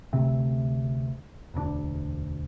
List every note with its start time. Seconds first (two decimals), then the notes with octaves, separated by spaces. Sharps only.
0.13 D2 C3 A3 C4
1.54 E1 D2 G#3 D4